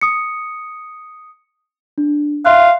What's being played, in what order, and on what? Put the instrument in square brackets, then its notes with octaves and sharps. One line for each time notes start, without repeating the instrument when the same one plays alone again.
[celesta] D#6 C#7
D4
[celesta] E5 C6 F#6 [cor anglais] F5